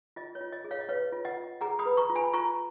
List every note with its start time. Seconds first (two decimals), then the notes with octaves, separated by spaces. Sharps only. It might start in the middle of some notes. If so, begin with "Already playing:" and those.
0.16 F4 D#5
0.35 C#5
0.41 F4
0.53 D#5
0.64 G#4
0.71 C#5 F5
0.80 D#5
0.89 B4 C#5 F5
1.13 F4
1.25 D#5 F#5
1.37 F4
1.61 G#4 F#5 A#5
1.79 B5 D#6
1.86 B4
1.97 A#5 C#6
2.10 F4
2.15 G#5 B5
2.33 F4 A#5 C#6